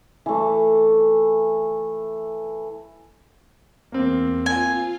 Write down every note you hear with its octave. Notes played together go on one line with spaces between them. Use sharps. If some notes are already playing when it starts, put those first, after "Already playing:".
E3 A3
E2 A#3 C4
F4 G#5